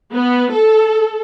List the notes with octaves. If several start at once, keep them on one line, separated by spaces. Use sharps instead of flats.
B3
A4